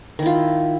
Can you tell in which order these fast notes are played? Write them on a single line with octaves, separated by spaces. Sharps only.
D#3 E4 F4